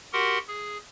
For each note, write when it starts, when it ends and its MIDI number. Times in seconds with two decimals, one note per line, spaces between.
0.13 0.38 66
0.13 0.38 67
0.13 0.38 70
0.13 0.38 78
0.13 0.38 84
0.48 0.78 68